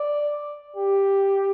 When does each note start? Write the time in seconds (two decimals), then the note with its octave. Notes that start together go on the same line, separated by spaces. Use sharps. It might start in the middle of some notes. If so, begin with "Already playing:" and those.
Already playing: D5
0.76 G4